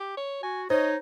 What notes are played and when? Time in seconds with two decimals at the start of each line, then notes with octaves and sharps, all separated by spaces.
0.01 G4
0.17 C#5
0.43 F#4 G#5
0.70 D#4 C5 C#5 D#5